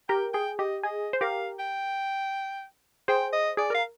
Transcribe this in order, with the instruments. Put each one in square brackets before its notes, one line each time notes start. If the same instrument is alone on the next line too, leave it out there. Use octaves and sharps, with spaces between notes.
[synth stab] G4 A#4 [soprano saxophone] G5
[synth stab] G#4 [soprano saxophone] G5
[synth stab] G4 [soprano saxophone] D#5
[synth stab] G#4 [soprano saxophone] D#5
[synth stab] C5
[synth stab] G4 A#4 [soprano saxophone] F5
[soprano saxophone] G5
[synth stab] G#4 C5 [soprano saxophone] G5
[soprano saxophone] D#5
[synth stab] G#4 [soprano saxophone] D5
[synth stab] A#4 [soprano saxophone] F5